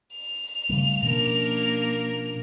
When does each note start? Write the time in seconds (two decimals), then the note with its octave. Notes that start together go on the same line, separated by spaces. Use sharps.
0.15 F7
0.69 C#3 G3 A3
1.03 B2 F3 A#3 C#4 D4 A#4